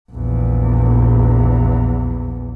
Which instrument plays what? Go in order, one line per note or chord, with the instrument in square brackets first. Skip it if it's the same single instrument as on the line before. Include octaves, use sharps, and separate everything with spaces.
[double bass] A#1 E2